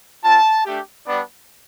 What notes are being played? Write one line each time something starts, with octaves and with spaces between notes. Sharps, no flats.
C4 F4 A5
A3 D4 G4
G3 B3 D4